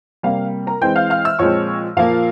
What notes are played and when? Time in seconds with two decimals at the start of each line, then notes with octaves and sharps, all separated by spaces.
0.23 C3 G3 A#3 F5
0.67 A#4 A#5
0.81 E3 G#3 C4 G5 G6
0.96 F5 F6
1.10 F5 F6
1.24 E5 E6
1.39 A#2 F3 G#3 C4 C#5 C#6
1.97 A#2 F3 A#3 F5